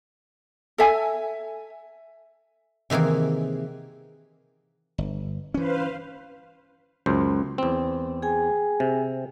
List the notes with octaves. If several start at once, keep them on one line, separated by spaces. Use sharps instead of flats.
A4 E5 G#5
C3 D#3 E3 A#3 G#4
G1
E3 C#4 B4 C5 F5
C#2 F#2 C5
E2 C4
G#4 G5 G#5
C3